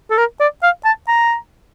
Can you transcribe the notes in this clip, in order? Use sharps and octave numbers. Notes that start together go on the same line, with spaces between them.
A4
A#4
D5
F5
A5
A#5